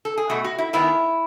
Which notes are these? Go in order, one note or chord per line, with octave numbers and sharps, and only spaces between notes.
A4
G#4
B2 A3 F#4
F#4
E4
D#3 G#3 B3 E4